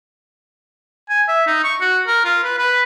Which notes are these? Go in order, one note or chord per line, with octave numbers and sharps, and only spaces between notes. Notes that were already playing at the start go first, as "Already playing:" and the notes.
G#5
E5
D#4
C#6
F#4
A#4
F4
B4
B4